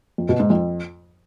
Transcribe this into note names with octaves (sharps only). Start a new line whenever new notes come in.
F2
B2
G#2
F2